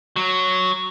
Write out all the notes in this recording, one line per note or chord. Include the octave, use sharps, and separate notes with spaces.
F#3